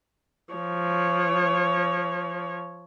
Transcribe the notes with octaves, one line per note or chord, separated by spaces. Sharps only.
F3 C#5